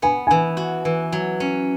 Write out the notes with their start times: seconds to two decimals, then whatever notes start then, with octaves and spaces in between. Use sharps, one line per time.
0.02 B3 G#5
0.27 E3 G#5
0.57 F#4
0.85 E3
1.13 F#3
1.40 C#4